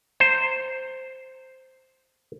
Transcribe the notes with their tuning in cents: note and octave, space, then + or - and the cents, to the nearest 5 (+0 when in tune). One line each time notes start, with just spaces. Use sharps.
C5 +0 A#5 -20